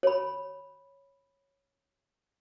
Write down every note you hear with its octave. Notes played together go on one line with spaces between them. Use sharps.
C#5 B5